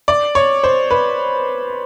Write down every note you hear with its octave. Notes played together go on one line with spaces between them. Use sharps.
D5
C#5
C5
B4